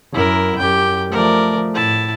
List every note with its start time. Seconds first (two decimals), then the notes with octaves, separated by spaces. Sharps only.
0.14 F#2 E4 A#4
0.58 F#2 G4 G5
1.12 F3 A3 A#4 D5
1.74 A2 E4 A5